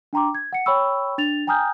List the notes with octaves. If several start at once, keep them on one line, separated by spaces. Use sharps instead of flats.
D4 G5 A#5 C6 D6
G#6
F#5 C#7
C#5 G5 B5 C#6 E6
D4 A6 F7
G5 G#5 A#5 D#6 F6 G6